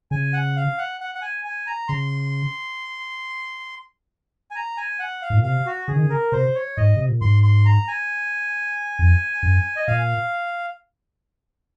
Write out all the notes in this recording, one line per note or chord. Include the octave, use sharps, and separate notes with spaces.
C#3 G#5
F#5
F5
F#5
F#5
F#5
G#5
G#5
A#5
C#3 C6
G#5
A#5
G#5
F#5
F5
G#2
A#2
C3 F5
F#4
C#3 G#4
D#3
C#3
A#4
C3 C5
C#5
G#2 D#5
C3
A#2
G#2 C6
C6
A#5
G#5
F2
F#2
D#5
A#2 F5